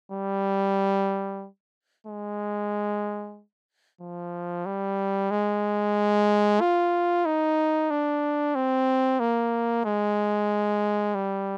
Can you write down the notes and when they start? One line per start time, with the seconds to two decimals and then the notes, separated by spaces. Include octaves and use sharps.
0.12 G3
2.07 G#3
4.01 F3
4.66 G3
5.31 G#3
6.61 F4
7.26 D#4
7.90 D4
8.55 C4
9.20 A#3
9.85 G#3
11.15 G3